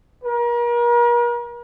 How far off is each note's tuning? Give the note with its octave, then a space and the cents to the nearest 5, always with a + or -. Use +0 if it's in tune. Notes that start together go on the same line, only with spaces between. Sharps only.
A#4 +40